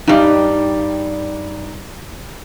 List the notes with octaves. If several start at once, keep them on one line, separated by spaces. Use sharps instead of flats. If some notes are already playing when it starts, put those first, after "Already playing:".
G2 G3 D#4 D#5